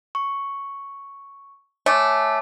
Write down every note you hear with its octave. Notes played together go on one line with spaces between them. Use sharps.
C#6
A3 C#5 G#5 D6